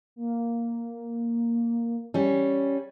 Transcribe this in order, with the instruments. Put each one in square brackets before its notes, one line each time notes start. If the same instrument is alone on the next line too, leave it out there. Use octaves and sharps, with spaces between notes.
[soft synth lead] A#3
[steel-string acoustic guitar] G3 C#4